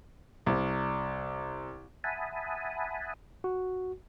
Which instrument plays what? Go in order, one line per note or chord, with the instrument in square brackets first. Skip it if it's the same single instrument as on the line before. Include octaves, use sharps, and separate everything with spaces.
[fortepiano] C2
[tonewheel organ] E5 F#5 G#5 A5 B5 D#6
[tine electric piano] F#4